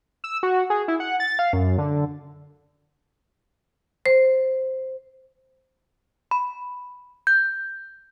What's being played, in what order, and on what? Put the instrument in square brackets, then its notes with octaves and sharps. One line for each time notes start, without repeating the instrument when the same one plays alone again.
[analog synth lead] E6
F#4
G#4
E4
F#5
A6
F5
F#2
D3
[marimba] C5
[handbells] B5
G6